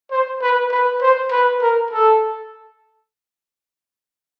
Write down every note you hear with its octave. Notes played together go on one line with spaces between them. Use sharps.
C5
B4
B4
C5
B4
A#4
A4